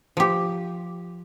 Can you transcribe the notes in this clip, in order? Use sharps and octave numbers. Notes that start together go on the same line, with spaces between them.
F3 G4